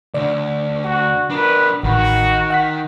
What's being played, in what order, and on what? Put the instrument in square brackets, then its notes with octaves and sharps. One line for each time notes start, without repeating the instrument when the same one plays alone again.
[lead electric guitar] D2 D3 [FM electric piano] D5
[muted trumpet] F#4
[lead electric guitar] D4 A#4 [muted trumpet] B4
[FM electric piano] A1 B5 [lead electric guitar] D#3 [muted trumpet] F#4
[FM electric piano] F#5 F#6 B6